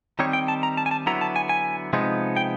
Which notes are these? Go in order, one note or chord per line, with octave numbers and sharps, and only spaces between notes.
D#3 G3 C4 D#4 C#5
G5
A5
A#5
A5
G#5
A5
D3 F#3 B3 E4 A#5
A5
G#5
G#5
C3 F3 G#3 B3 D#4
G5